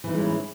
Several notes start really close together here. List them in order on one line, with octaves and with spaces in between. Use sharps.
E3 D#4 G#3 C#4 E4